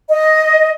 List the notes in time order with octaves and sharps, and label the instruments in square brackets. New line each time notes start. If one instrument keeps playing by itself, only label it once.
[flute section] D#5